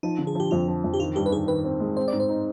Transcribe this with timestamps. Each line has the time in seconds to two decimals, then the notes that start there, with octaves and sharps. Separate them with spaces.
0.03 F3 D#4
0.19 D3
0.27 G#4
0.35 F3 G4
0.51 F2 F4
0.68 F3
0.84 F2
0.94 G4
1.00 D#3 F4
1.16 G2 G4
1.26 B4
1.32 D#3 G#4
1.48 D#3 B4
1.64 C4
1.80 G#3
1.97 C4 C5
2.08 D5
2.13 G#2
2.20 C5
2.29 D#4